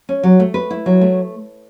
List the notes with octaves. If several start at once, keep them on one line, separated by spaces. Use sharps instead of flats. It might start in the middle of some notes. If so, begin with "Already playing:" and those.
C#4
F#3
A3
B4
E4
F#3
A3